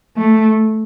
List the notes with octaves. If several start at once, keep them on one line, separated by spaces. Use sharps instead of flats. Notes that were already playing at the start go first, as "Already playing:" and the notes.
A3